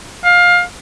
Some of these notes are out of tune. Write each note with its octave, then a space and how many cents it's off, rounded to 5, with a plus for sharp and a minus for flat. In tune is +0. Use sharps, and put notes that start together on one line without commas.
F5 +20